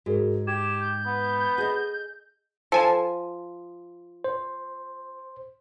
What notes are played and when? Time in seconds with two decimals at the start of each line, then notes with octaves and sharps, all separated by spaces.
0.06 G#2 F#4 G#4 A#4
0.47 G4 G#6 E7
0.81 G6
1.06 B3
1.58 G#4 A4 D#5
2.72 F3 A4 G#5 A5
4.24 C5